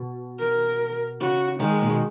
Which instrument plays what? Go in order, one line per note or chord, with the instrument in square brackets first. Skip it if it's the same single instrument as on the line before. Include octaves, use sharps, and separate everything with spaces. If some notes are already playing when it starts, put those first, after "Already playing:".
Already playing: [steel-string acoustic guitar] B2
[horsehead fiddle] A#4
[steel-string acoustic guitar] C#3 [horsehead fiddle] F#4
[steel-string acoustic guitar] D#3 [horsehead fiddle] G#3
[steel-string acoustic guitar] A#2
B2